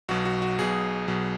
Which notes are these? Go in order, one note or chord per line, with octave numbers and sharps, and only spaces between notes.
B1 B2 F#3 F#4
F#4
F#4
B1 B2 F#3 G#4
B1 B2 F#3